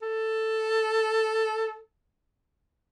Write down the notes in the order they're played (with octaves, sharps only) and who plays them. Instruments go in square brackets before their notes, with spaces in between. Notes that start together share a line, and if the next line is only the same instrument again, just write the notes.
[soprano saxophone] A4